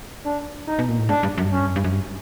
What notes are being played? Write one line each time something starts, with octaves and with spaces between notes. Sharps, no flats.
D4
D#4
B2
A#2
A2
G#2 D4
G2
F#2
G2
F#2 C#4
G2
F#2
G2
F#2
G2